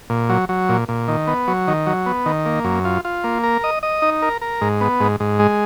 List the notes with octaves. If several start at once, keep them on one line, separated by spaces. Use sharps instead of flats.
A#2
F#3
F#3
A#2
A#2
D#3
B3
F#3
D#3
F#3
B3
D#3
A#3
F#2
F4
F4
A#3
A#4
D#5
D#5
D#4
A#4
A#4
G#2
B3
G#2
G#2
G#3